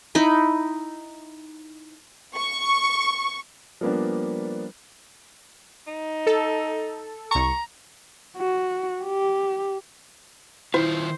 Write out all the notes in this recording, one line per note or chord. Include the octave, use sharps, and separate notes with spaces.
D#4 E4 B5
C#6
F3 G3 A#3 B3 D4
D#4
A4
C2 A#5 C#6
F#4
G4
D#3 E4 F4 C5